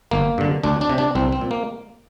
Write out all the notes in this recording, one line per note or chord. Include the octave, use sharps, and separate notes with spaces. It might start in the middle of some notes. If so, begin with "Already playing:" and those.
G1 A#3
G2 D3
D2 D4
D4
C3
D4
C2 C4
C4
A#2
A#3